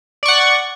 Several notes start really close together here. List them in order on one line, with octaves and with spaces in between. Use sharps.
D5 C#6 F#5